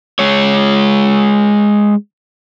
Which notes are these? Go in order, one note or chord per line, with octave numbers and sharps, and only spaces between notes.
G#3 C#5